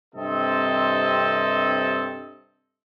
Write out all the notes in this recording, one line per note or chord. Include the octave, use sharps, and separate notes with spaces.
G2 C3 C4 A4 D#5